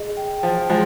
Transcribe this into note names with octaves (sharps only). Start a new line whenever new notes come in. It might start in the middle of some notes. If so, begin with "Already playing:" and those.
Already playing: G#4 D#5
G5
F3 G5
F3 G#3 G5